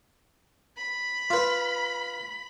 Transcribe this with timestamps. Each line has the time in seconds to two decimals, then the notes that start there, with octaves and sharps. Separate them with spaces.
0.77 B5
1.30 F4 B4